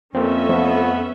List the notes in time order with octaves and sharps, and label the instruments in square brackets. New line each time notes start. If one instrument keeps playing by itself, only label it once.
[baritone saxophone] F2 [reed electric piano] A#3 C4 [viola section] C#4 A4 E5
[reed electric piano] F3 A3 [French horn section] B3